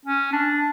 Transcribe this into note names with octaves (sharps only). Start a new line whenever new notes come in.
C#4
D4